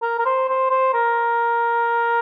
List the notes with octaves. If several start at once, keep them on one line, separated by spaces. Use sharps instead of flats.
A#4
A#4
C5
C5
C5
A#4